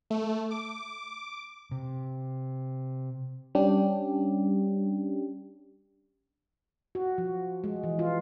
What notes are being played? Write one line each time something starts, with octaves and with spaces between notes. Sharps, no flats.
A3
D6
C3
G3 C#4 D4 G4
F#4
F3
G#3
E3
F4